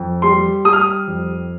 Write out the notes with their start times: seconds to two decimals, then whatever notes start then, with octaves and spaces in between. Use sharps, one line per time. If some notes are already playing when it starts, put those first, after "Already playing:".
Already playing: F2
0.22 G3 C6
0.65 G3 D#6
0.73 F6
0.81 D#6
1.07 F2